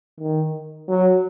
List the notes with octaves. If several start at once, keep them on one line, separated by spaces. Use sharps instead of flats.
D#3
F#3